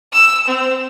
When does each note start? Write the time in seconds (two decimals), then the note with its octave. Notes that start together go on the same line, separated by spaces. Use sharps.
0.13 E6
0.48 C4